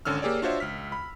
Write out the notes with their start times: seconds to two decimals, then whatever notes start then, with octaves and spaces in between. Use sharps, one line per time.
0.05 G#1 D3 C#4 E6 F6
0.22 A#3 G4 G#4 C#5 D5
0.42 D4 F4 F#4 C5 C#5 E5
0.60 C#2 F6 B6
0.92 B5